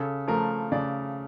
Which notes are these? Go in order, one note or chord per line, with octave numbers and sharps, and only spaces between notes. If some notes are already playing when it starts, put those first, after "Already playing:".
Already playing: C#3 A4
F3 A3 A#4
C#3 D5